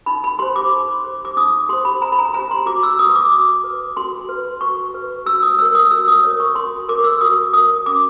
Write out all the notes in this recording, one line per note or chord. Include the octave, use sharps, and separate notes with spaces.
D#4 B5
B5
G4 C5 C6
D6
D#4
G4 C5
D6
D#4 D#6
G4 C5 C6
B5
D#4 A#5
B5
A#5
G4 C5 A#5
C6
F#4 D6
E6
B4 D#6
D6
F#4 D6
B4
F#4 C6
B4
F#4 C#6
B4
F#4 E6
D#6
A#4 C#5 E6
D#6
F#4 E6
D#6
A#4 C#5
C#6
F#4 C6
A#4 C#5 D6
E6
F#4 D#6
A#4 C#5 D#6
C#4 D6